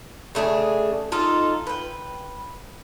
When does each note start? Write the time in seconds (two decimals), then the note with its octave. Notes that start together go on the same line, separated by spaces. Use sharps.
0.35 C#3 A3 D4 G#4
1.12 D#4 F4 A4
1.67 B4 G5